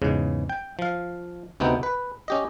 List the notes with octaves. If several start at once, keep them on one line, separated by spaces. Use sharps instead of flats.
E2 G#2 C#3
G5
F3 F5
D2 C3 B3 C4 D#4 G5
B4
C#4 G4 D#5